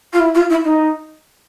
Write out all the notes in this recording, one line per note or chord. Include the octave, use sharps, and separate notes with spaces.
F4
E4
F4
E4
D#4